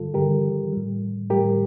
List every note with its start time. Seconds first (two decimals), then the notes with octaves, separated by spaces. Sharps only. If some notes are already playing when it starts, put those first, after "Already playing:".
Already playing: G2 D3 G3 F4 A4
0.14 G2 D3 G3 G4 A#4
0.73 A2 G3
1.30 A2 G3 G4 A#4